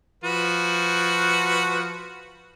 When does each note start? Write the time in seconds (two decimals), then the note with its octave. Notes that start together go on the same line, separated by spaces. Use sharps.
0.24 F3 F#4 B4